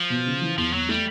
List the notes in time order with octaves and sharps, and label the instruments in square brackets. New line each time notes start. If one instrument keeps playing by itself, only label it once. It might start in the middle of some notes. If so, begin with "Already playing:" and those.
Already playing: [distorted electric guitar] F3
[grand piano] B2
C#3
E3
[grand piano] E2 [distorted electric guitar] F3
[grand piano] E2 [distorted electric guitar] F#3
[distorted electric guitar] G3 [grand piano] A3